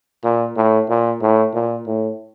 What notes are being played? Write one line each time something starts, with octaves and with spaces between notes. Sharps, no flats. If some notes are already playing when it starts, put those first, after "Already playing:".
A#2
A2
A#2
A2
A#2
A2